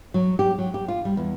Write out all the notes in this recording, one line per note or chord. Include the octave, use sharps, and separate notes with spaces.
F#3
G4
F#3
G4
F4
G3
E2